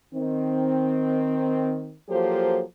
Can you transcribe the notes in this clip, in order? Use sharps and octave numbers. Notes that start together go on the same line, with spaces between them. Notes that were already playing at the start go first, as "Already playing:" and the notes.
D#3 C4
F3 F#3 A#3 G4 A4 C5